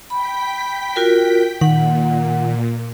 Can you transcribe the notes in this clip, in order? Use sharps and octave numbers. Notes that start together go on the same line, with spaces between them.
G5 B5 B6
F4 F#4 A#4
A#2 D#3 F#5